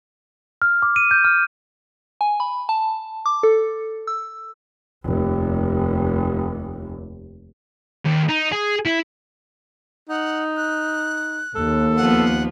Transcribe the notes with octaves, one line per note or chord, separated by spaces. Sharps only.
F6
D6
D#7
G6
F6
G#5
B5
A5
D6
A4
E6
F1 D#2
D#2
D#4
G#4
E4
D#4 F#5
F#6
D#2 A4
F3 A#3 B3 F#5